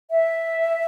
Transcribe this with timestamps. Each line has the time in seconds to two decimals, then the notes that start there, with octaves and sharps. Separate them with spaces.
0.10 E5